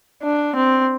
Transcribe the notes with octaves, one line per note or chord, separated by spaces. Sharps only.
D4
C4